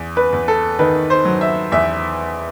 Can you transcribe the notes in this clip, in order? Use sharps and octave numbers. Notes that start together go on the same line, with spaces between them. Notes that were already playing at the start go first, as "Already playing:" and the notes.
Already playing: E2
B4
E2
A4
D#3 B4
C5
F#3
E5
E2 E5